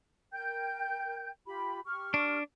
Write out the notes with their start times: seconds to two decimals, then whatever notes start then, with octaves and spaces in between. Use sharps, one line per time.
0.33 A#4 G5 G6
1.46 F4 G4 B5
1.85 G4 C#6 F6
2.14 D4